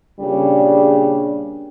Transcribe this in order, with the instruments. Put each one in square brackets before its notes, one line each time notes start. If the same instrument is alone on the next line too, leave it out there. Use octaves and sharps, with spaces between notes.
[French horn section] A#2 C#3 G3 D4